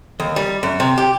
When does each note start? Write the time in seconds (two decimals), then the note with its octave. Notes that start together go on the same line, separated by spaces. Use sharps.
0.20 D#2
0.36 G3
0.63 F#2
0.80 C3
0.98 G4